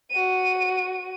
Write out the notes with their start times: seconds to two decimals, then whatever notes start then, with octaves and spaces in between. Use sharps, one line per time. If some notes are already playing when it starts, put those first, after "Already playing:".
0.11 F#4 D#7